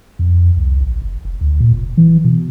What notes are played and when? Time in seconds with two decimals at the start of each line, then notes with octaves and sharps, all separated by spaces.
0.19 F2
0.57 C2
0.81 A1
1.02 F#1
1.25 F1
1.41 D2
1.60 A#2
1.73 F1
1.97 E3
2.24 B2